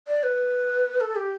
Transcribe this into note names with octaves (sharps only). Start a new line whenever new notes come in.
D5
B4
A4
G4